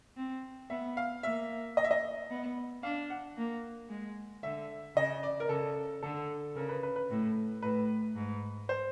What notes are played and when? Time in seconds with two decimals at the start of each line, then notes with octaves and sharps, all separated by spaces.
0.17 C4
0.70 B3 E5
0.97 F5
1.23 A#3 E5
1.77 D#5
1.84 E5
1.91 D#5
2.30 B3
2.83 D4 F5
3.10 F#5
3.37 A#3
3.89 G#3
4.43 D3 E5
4.96 C#3 D#5
5.23 D5
5.40 A#4
5.49 C#3 A4
6.03 D3 A4
6.56 C#3 A#4
6.69 B4
6.83 B4
6.96 B4
7.10 A2
7.62 A2 B4
8.16 G#2
8.69 C5